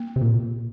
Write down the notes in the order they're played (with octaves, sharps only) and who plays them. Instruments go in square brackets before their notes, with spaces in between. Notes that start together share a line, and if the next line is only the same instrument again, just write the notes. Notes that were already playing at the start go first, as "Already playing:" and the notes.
Already playing: [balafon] A#3
[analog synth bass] C3
A#2